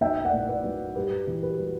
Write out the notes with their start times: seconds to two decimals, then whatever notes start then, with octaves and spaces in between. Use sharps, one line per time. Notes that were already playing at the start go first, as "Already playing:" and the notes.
0.01 B1 E5 G5
0.25 D5 F#5
0.33 A2
0.48 B4 D5
0.64 F#3
0.96 G2 G4 B4
1.27 E3
1.43 G4 B4
1.59 G3